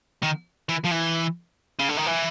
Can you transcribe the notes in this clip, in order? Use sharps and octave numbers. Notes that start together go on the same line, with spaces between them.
D#3
E3
F3
E3
C#3
D3
D#3
E3